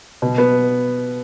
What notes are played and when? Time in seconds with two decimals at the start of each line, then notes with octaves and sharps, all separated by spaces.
0.22 B2
0.38 B3